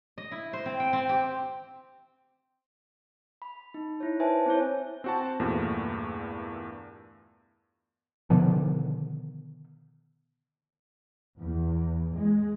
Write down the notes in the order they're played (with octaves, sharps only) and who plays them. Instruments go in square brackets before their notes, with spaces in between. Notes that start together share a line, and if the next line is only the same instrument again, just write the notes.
[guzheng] D#5
E4
C5
C4
G5
C4
G4
[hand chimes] B5
D#4
E4 C#5
B4 C5 E5 G#5 A5
C4 E4 C#5
[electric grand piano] C4 F#4 A5
E2 G2 A#2 A3
[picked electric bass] B2 D3 D#3 F3
[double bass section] E2
G#3